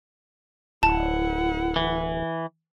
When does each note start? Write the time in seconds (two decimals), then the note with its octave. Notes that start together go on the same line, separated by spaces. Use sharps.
0.83 D1 E4 F#5 A5
1.76 E3